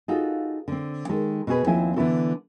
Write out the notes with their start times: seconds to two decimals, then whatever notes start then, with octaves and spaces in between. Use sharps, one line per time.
0.08 D#4 F4 F#4 G#4 A4
0.68 D3 C4
1.09 D#3 G#3 A4
1.47 B2 F#4 G#4 B4
1.66 D#2 F3 C4 E4 G#5
1.96 D3 E3 B3 E4 F#4 A4